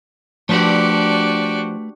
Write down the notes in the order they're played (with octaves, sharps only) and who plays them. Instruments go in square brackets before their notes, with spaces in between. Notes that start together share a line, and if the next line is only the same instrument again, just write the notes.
[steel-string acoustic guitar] F3 [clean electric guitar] A3 B4 D5 [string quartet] D4 [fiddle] F#4 G4